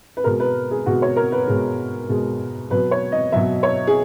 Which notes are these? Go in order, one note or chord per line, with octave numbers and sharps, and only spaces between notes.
B4
B2 G#3 A#4
B4
G#4
B2 G#3 F#4
C#5
A#4
B4
B2 G#3
B2 G#3
B2 F#3 B4
C#5
D#5
B2 F#3 E5
C#5
G#4